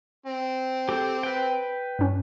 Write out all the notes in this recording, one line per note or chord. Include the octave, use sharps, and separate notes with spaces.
C4
G4 A4 C5
B4 G5
G2 C#4